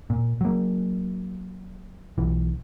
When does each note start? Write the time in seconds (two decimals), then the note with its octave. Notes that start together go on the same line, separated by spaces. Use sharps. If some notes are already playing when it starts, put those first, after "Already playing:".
0.10 A#2
0.41 F#3 A#3
2.18 B1 E3